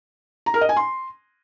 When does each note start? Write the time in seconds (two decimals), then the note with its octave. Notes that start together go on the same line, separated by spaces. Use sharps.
0.46 A#5
0.54 A#4
0.61 D#5
0.69 G#5
0.77 C6